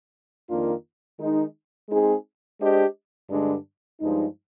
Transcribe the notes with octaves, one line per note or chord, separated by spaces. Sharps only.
F2 D#3 A#3 D4 F4
D#3 G#3 D#4
G#3 C4 D#4 G#4
G#3 D4 G4 C5 D#5
G2 D3 G#3 D4
G2 F3 G#3 D#4